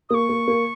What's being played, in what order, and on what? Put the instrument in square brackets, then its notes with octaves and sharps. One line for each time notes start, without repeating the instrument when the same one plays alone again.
[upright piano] A#3 [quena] C#6 D#6
[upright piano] A#3
A#3